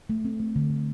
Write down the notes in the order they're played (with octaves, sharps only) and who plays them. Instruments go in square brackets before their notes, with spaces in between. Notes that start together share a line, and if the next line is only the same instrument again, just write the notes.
[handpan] A3
C4
A3
D3
D3